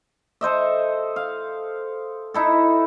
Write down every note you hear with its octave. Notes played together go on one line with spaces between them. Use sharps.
A4 C5 D#5 E5
F5
D#4 E4 A4